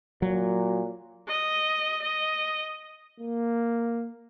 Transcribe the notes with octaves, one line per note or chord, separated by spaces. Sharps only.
A#2 F#3
D#5
D#5
A#3